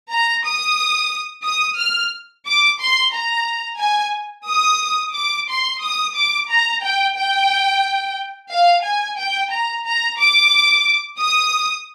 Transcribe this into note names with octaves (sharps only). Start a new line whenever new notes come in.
A#5
D#6
D#6
F6
D6
C6
A#5
G#5
D#6
D6
C6
D#6
D6
A#5
G5
G5
F5
G#5
G5
A#5
A#5
D6
D#6